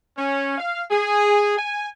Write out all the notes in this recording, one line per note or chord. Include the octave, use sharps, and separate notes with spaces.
C#4
F5
G#4
G#5